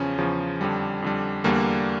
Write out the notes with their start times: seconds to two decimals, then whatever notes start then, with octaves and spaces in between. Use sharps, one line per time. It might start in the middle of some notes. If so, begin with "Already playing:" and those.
Already playing: E2 C#3 F3 C#4
0.18 E2 C#3 F3
0.61 F2 D3 G3
1.02 F2 D3 G3
1.44 E2 D3 G3 A#3